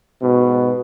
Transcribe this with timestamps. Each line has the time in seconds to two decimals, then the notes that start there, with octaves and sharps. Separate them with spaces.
0.22 G#2 B2